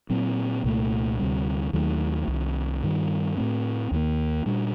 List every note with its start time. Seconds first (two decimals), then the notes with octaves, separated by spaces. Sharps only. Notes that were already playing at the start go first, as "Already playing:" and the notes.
0.10 A#2 F#3 C4
0.64 C2 A#2 F#3 A3
1.19 D2 C3 G3
1.73 D#2 D#3 F#3 A3
2.28 C2 C3 D#3
2.83 G2 D#3 G3
3.37 A2 A3 C4
3.92 D#2 D#3 F#3 A#3
4.46 A#2 G3 D4